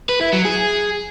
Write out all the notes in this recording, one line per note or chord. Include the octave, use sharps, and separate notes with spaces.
B4
E4
F#3
G#4